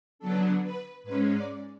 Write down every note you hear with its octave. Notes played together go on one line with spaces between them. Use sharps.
D3 F#3 B3 D4 A4
B4
G#2 G#3 C#4 B4
D5